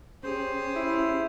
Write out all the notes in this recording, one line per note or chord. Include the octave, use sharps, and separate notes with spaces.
C#4 G4 G#4 C5
E4